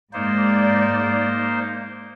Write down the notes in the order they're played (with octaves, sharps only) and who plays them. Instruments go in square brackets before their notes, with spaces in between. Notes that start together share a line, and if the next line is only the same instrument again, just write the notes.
[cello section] G#2 D5 [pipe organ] A#3 D#4 C5